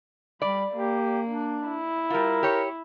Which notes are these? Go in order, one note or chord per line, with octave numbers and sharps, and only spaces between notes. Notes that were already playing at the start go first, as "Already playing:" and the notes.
G3 D5 B5
A#3 G4
D4
E4
G3 F4 A#4
G4 C#5